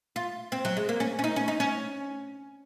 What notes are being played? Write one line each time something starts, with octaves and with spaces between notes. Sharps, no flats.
F4
C4
F#3
G#3
A#3
C#4
C#4
D#4
C#4
D#4
C#4